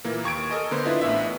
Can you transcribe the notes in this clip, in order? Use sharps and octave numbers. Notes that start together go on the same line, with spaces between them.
A#2 E3 A#3
D#2 C#6 G#6 D7
A4 A#4 D#5 G#5
D3 A#3 B3 C5
D4 E4 F4 B4 D#5
A1 A2 B3 E5